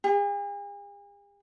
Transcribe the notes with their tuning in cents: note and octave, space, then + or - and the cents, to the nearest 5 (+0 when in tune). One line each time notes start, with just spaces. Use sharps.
G#4 -45